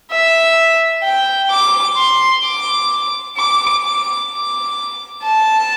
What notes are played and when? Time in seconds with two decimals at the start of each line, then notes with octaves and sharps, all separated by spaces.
0.11 E5
1.03 G5
1.50 D6
1.97 C6
2.44 D6
3.37 D6
3.83 D6
4.30 D6
5.23 A5